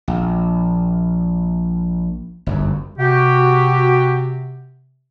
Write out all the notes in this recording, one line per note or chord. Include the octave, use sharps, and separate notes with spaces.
A#1
G1 F#2
C3 F#4 G4